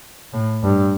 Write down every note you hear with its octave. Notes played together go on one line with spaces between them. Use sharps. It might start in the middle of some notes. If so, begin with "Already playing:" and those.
A2
G2